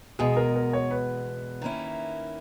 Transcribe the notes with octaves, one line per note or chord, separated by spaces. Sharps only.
E2 B2 G#3 G#4
A#4
A#4
C#5
B4
D#3 A#3 C#4 E4